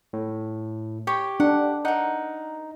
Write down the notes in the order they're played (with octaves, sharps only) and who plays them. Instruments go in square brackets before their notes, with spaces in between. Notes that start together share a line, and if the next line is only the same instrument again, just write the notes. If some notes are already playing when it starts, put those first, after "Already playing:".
[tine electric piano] A2
[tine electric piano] G4 [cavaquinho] C#5
[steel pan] D4 [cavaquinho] F#5
[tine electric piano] D#4 [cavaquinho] A#4 F#5